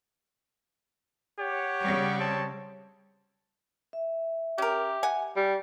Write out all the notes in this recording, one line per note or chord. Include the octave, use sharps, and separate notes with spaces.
G4 C#5 F#5
C#3 G3
C4 C#5 A5
E5
C#4 G4 A#4
F#5 G#5
G3